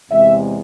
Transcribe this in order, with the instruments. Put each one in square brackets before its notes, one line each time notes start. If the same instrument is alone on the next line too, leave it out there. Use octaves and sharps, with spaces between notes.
[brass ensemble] E2 C3 G#3 E5